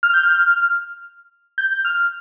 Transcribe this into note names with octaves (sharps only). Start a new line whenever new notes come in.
F6
G6
F6
G6
F6